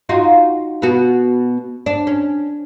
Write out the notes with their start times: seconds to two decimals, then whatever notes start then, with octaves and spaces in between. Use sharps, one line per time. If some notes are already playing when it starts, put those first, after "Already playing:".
0.09 D#4 F4 F#4
0.82 B2 B3 F#4
1.86 D4
2.07 C#4